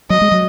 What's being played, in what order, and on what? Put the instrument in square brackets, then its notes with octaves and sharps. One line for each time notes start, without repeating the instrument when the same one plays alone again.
[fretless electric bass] F#3 [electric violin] D#5
[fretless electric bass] G#3
F#3